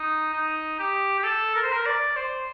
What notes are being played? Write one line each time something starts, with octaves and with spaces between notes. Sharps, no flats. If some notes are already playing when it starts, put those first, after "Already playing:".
Already playing: D#4
D#4
G4
G4
A4
A#4
C5
A#4
D5
C5